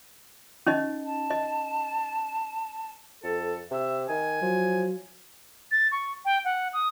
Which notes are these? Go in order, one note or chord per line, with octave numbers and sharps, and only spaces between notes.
C#4 D#4 D#5
A5
D#5
F2 A4
C3 E5
D#3 G#5
F3 F#3
A6
C#6
G5
F#5
D#6